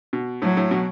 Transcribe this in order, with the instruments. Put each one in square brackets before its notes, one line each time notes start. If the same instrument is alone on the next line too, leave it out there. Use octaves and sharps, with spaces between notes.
[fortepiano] B2
[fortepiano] A2 [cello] F#3
[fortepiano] A2
B2